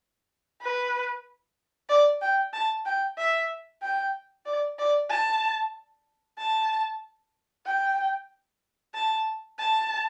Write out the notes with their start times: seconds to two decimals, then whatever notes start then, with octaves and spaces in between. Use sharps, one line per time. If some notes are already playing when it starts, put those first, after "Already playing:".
0.62 B4
1.89 D5
2.22 G5
2.54 A5
2.86 G5
3.18 E5
3.82 G5
4.46 D5
4.79 D5
5.10 A5
6.38 A5
7.66 G5
8.95 A5
9.59 A5